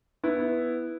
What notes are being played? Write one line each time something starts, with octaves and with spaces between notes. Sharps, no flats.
B3 E4